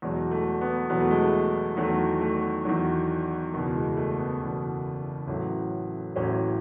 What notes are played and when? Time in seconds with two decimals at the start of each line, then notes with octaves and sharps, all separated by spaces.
0.02 E2 B2 F#3 G#3
0.31 A3
0.61 B3
0.90 E2 B2 F#3 B3
1.01 A3
1.11 G#3
1.22 A3
1.77 E2 D#3 F#3 A3
2.21 A3
2.65 E2 D#3 F#3
3.53 F#1 E2 B2
3.75 G#3
3.97 A3
4.18 B3
4.40 F#1 E2 B2
5.27 A1 A2 F#3
6.16 A1 A2 F#3 C#4